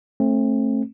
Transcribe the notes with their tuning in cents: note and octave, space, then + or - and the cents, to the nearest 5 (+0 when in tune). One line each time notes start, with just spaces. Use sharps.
A3 +0 C4 +40